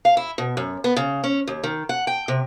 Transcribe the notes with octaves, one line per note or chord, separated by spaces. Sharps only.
F5
E4
B2
F#2
B3
C#3
C#4
D#2
D#3
F#5
G5
C3